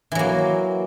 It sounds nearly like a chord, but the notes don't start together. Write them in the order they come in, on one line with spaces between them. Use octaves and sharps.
E3 F#3 A#3